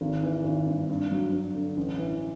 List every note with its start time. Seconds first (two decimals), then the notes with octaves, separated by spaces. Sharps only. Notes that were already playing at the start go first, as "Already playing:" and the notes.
0.01 G#1
0.23 E3
0.44 G#1
0.67 G2
0.89 G2
1.11 F#3
1.32 G2
1.55 D3
1.77 A1
1.98 E3